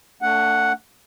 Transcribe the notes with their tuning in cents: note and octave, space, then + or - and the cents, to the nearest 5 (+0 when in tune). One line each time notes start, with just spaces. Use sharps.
A3 +25 D4 -30 F#5 +0